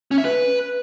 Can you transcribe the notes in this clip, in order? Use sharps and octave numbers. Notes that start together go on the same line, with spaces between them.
C#4
E5
B4